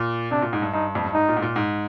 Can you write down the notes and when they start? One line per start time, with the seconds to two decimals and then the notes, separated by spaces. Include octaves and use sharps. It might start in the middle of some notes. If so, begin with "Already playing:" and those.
Already playing: A#2
0.31 C3 D4
0.42 A#2
0.53 G#2
0.62 G2
0.73 G2 D#4
0.95 F2
1.05 G2
1.14 G#2 D#4
1.29 A#2
1.37 G#2
1.42 A#2
1.56 G#2